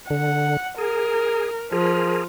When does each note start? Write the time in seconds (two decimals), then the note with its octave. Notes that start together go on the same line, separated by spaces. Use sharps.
0.10 D3 F#5
0.78 G#4 A#4
1.72 F3 G#4 A#4